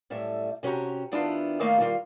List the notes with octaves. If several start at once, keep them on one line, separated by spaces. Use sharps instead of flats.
F#2 A2 G3 E5
C3 C#4 F#4 G4 A#5
D#3 B3 D4 E4 F4
E2 D#3 A3 A#3 D#4 F5
D#3 G3 A#3 F4